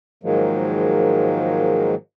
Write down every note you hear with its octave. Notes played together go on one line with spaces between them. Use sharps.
G#2 D#3 F3 F#3 G#3 A#3